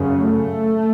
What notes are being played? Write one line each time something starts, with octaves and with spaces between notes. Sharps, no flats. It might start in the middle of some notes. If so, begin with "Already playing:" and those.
Already playing: F#2 C#3
A3